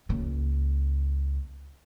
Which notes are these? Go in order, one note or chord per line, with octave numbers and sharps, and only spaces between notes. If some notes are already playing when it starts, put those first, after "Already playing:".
C#2 A#3